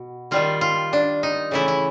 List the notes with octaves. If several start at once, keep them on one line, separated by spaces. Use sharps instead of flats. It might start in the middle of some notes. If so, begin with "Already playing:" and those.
Already playing: B2
D#3 G3 A#3 F4
F4
D4
D#4
C#3 E3 A3 E4
E4